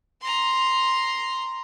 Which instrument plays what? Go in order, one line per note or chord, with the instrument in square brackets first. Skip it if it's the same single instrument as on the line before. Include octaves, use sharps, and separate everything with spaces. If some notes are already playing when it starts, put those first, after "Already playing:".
[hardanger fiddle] A#5 C6